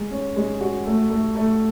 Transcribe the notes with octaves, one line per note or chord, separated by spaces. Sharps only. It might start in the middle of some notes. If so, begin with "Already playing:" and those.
Already playing: G#3
C#4
G#3
F#4
A3
A3
A3